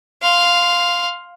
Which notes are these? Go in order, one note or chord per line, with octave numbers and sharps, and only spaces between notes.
F5 C6